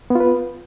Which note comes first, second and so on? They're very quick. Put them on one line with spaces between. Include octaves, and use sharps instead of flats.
B3 F4 B4